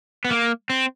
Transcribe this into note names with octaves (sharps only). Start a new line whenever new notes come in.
B3
A#3
C4